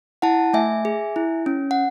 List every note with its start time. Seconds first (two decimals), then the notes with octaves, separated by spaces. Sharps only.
0.22 E4 F#5 A5
0.53 A3 E5 G#5
0.85 G#4
1.16 E4
1.46 C#4
1.71 F#5